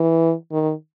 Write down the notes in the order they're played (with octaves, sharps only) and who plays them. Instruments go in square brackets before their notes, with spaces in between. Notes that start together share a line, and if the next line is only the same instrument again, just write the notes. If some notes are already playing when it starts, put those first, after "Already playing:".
Already playing: [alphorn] E3
D#3